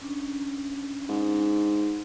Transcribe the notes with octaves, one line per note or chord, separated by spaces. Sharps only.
C#4 D4
G#2